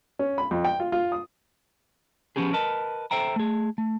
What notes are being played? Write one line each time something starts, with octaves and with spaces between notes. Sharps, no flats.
C#4
B5
F2
G5
F4
F4
D#6
F3 F#3 B3 C#4 G4 G#4
A#4 B4 D#5 A5
A4 C5 E5 G5 A#5
A3 G#4
A3